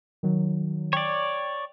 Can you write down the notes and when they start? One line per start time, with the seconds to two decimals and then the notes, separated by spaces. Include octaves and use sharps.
0.23 D#3 F#3
0.93 C#5 D5 G5